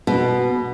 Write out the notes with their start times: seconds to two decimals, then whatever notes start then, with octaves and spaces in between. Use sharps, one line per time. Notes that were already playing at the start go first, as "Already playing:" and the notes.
0.07 B2